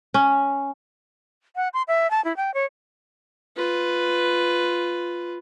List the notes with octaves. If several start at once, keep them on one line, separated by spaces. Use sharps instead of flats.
C#4
F#5
C6
E5
A5
E4
G5
C#5
F4 B4